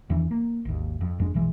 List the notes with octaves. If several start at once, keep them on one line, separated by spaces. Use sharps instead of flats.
E2 D#3 E3 D4
A#3
G#1 D#2
F2
F1 F2 G#3 D4
A#1 B2 E3 G#3